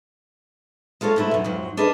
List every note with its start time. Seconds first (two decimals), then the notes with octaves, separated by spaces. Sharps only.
1.01 G#3 F4 A4 C5 C#5
1.16 G#2 A3 E4
1.31 F#2 B2
1.44 F2 G#2 F#3
1.77 D4 G#4 A#4 B4 D#5